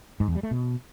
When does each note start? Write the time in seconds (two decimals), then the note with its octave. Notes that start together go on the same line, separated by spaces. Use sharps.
0.20 G#2
0.28 E2
0.36 G3
0.43 A3
0.51 B2